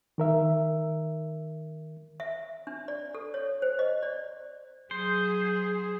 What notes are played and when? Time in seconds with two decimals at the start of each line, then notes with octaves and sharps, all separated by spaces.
0.18 D#3 A#4 E5
2.20 E5
2.67 D4
2.88 D5
3.14 A4
3.34 C#5
3.62 C5
3.79 D#5
4.03 D5
4.91 F#3 G#4 C5